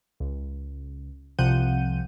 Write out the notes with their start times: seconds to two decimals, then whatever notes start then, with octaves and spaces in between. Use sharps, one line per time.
0.20 C#2
1.39 C2 C3 F3 F#5 G6 D#7